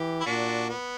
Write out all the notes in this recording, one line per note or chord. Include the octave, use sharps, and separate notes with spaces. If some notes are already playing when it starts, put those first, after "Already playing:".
Already playing: E3 G4
E4
A#2 D4 F#4
B3